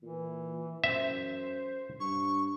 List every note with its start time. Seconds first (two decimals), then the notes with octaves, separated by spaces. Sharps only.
0.02 A#2 E3
0.84 F#2 C5 E5
2.00 G2 C#6